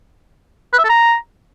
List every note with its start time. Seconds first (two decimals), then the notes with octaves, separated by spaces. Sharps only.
0.73 B4
0.78 E5
0.84 A4
0.89 A#5